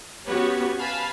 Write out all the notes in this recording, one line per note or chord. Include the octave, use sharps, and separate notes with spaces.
B3 C#4 F#4 G4 B4 C#5
B4 F5 G#5 A5 B5